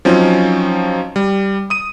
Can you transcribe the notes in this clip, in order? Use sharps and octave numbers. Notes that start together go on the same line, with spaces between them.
F3 F#3 C4 C#4 D#4
G3
D#6 D#7